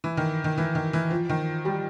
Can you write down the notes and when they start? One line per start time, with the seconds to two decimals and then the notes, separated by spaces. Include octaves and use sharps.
0.04 E3
0.17 D#3
0.44 D#3
0.57 E3
0.75 D#3
0.93 E3
1.11 F3
1.29 D#3
1.65 G3